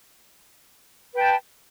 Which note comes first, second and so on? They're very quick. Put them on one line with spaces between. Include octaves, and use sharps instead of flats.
B4 G5 A5